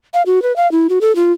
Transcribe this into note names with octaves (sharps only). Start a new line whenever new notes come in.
F5
F#4
B4
F5
E4
F#4
A4
F4